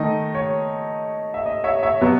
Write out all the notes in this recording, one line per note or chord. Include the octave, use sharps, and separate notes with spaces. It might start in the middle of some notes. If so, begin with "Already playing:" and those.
Already playing: D#3 A3 D#4 D#5
C#5
E5
D#5
C#5 E5
C#5 E5
B2 F#3 B3